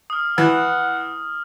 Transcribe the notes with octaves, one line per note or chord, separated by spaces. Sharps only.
D#6 F6
E3 F#5